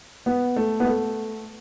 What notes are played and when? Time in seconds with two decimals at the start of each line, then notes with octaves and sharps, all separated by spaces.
0.26 B3
0.56 A3
0.80 B3
0.87 A3